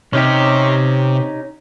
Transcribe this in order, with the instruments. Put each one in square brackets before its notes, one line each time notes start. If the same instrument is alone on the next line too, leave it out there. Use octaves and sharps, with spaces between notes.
[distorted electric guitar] C3 [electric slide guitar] C#4 D#4 G4